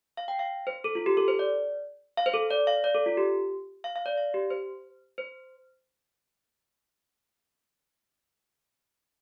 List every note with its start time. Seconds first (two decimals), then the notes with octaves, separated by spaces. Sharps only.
0.17 F5
0.28 G5
0.39 F5
0.67 C5
0.84 A4
0.95 F4
1.06 G4
1.17 A4
1.28 C5
1.39 D5
2.17 F5
2.26 C5
2.34 A4
2.50 D5
2.67 F5
2.84 D5
2.95 A4
3.06 F4
3.17 G4
3.84 F5
3.96 F5
4.06 D5
4.17 F5
4.34 G4
4.50 C5
5.18 C5